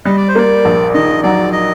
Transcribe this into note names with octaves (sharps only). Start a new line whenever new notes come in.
G3 D#5
D5
C5
A#3 D5
A#1
D#3 D#5
F#3 D5
D#5